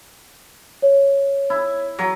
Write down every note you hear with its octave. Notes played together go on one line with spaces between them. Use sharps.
C#5
E4
F#3